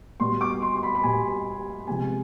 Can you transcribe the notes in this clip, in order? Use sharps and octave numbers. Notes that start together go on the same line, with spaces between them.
B2 G3 B3 C6
D6
C6
C6
B5
B5
B2 G3 B3 G#5
C3 F3 G#3 B3 G#5